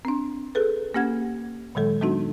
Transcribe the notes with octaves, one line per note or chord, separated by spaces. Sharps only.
C4 D4
G#4 A4 B4
A#3 C#4 G4 F#5 G#6
A#2 D#3 F#3 G#3 A4
F#3 G#3 B3 D4 D#4 F#4